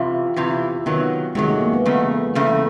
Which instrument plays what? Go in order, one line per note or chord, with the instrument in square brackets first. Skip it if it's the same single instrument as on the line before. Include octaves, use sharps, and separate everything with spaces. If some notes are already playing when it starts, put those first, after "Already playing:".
Already playing: [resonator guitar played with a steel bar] E2 C3 E3 [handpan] F4
[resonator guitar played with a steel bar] E2 C3 E3
[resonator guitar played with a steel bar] C3 D#3 F#3 [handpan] B3
[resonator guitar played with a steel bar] C3 D#3 F#3 [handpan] G#3
[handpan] A3
A#3
B3
[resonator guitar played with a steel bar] E2 C#3 A3
E2 C#3 A3